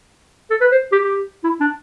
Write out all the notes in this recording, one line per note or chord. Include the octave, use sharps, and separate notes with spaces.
A4
B4
C5
G4
G4
E4
D4